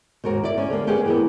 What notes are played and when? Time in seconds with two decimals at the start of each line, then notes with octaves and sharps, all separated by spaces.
0.24 D#2 G#2 F#4 A#4
0.44 E4 D5
0.58 C#4
0.70 D3 G3 A#3
0.87 C#4 G4 G#4 B4 F#5
1.06 E3 A#3 B3